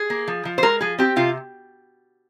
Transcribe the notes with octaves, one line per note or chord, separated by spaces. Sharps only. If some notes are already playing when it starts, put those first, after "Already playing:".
Already playing: G#4
A#3
F3
F3
C5
G#3 A#4
F3 G#4
C4 G4
C3 F4